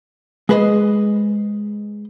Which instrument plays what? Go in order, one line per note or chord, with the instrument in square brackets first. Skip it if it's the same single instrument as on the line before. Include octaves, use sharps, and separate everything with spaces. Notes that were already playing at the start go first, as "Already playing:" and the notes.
[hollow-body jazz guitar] G#3 G#4 B4 C5 D#5